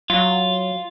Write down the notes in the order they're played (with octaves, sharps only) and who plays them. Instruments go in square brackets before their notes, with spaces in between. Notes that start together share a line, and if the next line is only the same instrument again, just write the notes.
[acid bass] F#3 [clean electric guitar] F4